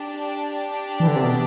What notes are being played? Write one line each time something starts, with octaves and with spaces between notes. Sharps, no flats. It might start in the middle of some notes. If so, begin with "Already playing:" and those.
Already playing: D4 G4 D5 A5
E3
D3
C3
B2